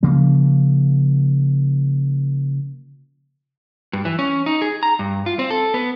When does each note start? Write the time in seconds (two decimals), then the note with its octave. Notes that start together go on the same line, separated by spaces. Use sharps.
0.03 C#3 F3 A#3
3.93 G2
4.05 E3
4.19 C#4
4.46 D#4
4.62 G#4
4.83 A#5
4.99 G2
5.26 F4
5.39 C4
5.50 A4
5.74 B3